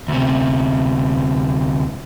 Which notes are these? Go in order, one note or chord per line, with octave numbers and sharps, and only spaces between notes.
D2 C3